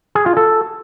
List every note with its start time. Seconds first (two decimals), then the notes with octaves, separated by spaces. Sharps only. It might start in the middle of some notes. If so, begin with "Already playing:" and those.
0.15 G#4
0.26 F4
0.37 A4